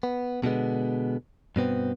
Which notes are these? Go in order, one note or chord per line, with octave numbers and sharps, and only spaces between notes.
B3
B2 D3 G#3 B3
G2 B2 B3 C4